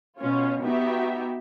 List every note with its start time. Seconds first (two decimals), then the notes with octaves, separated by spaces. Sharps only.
0.19 B2 C#4 F4 C#5
0.63 B3 D#4 F#4 G4 E5